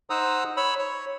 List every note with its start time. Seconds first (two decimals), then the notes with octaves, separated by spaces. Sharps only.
0.10 D#4 C5 F#5 A#5 D#6 E6
0.57 C#5 B5 E6
0.79 C#5